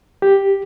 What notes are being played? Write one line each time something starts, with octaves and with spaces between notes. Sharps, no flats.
G4